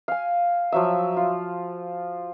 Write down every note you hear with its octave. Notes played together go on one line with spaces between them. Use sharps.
F5 G#5
F3 F#3 E5
F4